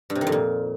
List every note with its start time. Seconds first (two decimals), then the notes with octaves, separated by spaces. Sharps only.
0.10 G2
0.15 C3
0.21 D#3
0.27 F2
0.32 A#2